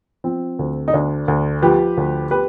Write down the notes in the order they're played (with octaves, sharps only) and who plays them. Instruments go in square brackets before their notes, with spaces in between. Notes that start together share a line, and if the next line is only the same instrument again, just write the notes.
[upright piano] F3 C4
D2
D#4
D2 D4
D2
F3 G4 B4
D2
G4 B4